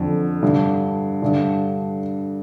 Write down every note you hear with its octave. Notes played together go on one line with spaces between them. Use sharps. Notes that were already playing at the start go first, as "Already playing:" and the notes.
Already playing: F2 D3
G2 D3
G2 D3